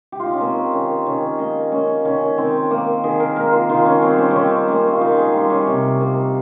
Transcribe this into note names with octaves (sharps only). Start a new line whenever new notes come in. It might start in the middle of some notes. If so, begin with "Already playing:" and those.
G4
F4
D#4
C#4
A#3 C4
D#3 C#4
D#3 C#4
A#3 D#4
A#3 C#4
D#3 C#4
D#3 C4
A#3
D#3 G#4
A#4
A#3 A#4
F4
D#3 F4
C#4
G3 C4
C#4
D#3 C4 C#4
A#3 C#4
F4
D#3 D#4
G#4
G3 F4
C#4
C3
A#3